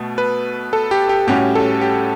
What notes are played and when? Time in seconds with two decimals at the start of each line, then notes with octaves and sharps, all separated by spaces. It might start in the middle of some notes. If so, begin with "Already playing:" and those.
Already playing: B2 A3
0.18 B4
0.73 A4
0.91 G4
1.09 G4
1.27 A2 G3 C#4 F#4 G4
1.55 A4
1.81 G4